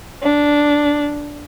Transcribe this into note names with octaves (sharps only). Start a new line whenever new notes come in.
D4